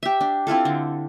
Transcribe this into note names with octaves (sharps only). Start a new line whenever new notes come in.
G4 E5
D4
C4 E4 F4 A4
D3